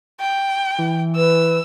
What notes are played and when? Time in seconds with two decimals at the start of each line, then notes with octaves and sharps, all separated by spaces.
0.20 G5
0.78 E3
1.16 B4 E6